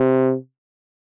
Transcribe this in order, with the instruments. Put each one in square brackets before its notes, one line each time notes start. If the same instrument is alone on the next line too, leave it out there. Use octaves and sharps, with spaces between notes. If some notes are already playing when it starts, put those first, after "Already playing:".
Already playing: [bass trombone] C3